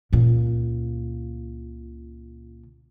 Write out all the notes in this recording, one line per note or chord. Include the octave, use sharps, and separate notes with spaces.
C#2 A#2